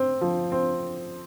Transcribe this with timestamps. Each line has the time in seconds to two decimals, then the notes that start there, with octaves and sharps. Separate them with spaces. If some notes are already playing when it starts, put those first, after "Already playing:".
Already playing: C4
0.21 F3
0.52 C4